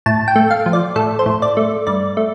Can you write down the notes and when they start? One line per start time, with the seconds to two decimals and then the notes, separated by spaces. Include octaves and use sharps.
0.06 A2 A5
0.28 G5
0.36 A3
0.51 F5
0.66 F3
0.73 D5
0.96 A2 A4
1.19 C5
1.26 A2
1.42 D5
1.57 A3
1.87 G2 D5
2.17 A3